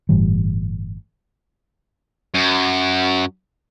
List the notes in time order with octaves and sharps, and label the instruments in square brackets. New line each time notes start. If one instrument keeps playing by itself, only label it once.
[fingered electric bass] G1 A2 E3 G3
[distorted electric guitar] F#2